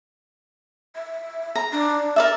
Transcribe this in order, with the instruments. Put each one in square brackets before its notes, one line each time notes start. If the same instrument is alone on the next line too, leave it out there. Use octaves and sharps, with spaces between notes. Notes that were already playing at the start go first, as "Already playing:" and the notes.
[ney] E5
[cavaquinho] A#5
[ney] D4
[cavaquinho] A#4 D5 E5